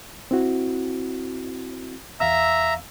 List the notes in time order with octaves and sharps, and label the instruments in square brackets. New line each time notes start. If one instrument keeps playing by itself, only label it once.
[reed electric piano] C4 E4 F#4
[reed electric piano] E2 F5 E6 [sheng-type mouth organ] E5 A#5